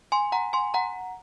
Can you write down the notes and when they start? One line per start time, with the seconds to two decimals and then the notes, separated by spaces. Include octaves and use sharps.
0.12 G#5 C6
0.32 F#5 A#5
0.53 G#5 C6
0.74 F#5 A#5